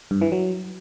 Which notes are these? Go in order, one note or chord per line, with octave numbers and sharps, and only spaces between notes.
G2
E3
F#3